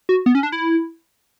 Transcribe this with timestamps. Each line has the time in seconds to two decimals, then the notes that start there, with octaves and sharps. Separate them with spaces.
0.09 F#4
0.26 B3
0.35 C#4
0.43 D4
0.52 E4